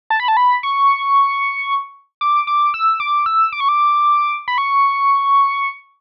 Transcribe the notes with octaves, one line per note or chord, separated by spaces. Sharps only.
A5
B5
A5
B5
C#6
D6
D6
E6
D6
E6
D6
C#6
D6
B5
C#6